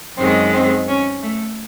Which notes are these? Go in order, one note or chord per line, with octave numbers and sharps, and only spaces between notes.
F#2 D#3 G#3 C4
C4
C#4
A3